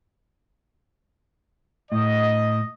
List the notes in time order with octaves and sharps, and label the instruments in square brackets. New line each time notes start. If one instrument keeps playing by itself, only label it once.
[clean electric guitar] A2 [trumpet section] D#5